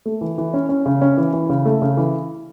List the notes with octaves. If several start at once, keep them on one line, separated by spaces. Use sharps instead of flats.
A3
E3
E3
C#4
C#4
C#3
C#4
E3
E3
C#3
A3
C#3
E3